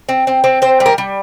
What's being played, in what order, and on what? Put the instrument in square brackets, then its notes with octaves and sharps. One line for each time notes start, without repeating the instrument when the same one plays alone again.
[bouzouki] C4
C4
C4
C4 C5
G3
A#4
G3